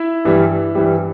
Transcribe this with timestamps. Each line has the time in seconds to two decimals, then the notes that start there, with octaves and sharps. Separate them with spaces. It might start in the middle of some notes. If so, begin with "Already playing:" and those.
Already playing: E4 E5
0.25 G2 E3 G3
0.75 G2 E3 G3